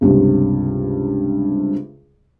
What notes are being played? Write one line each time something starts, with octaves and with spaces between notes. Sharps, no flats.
C#2 G2 C3